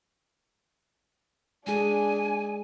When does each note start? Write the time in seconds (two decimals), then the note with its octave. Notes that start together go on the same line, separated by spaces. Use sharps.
1.67 G#3 D4 G#4 G#5